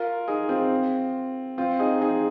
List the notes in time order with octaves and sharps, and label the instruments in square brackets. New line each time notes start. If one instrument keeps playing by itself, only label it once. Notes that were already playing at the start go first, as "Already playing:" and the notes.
Already playing: [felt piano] F4 A#4
D#4 G#4
C4 F4
C4 F4
D#4 G#4
D#4 G#4